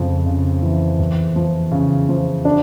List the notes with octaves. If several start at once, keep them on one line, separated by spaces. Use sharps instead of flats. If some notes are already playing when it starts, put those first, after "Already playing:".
Already playing: F2 C#3
C#3
E3
E2
F3
C#3
F3
D4